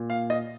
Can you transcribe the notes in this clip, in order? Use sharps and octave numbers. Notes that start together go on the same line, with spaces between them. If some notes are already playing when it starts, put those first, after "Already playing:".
Already playing: A#2
F5
D#5